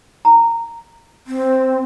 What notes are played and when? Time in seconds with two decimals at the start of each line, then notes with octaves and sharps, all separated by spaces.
0.25 A#5
1.27 C4